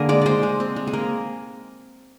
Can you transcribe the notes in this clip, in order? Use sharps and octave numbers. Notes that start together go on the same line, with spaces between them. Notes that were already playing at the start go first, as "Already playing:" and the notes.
Already playing: D3 A#3 G#4 A#4
G#3 D5
G#3 C5 D5
G#3
C4
G#3
G#4
A#3 A#4